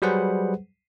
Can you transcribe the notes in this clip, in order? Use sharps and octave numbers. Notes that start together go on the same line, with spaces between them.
F#3 G3 G#4 B4 C5 F#5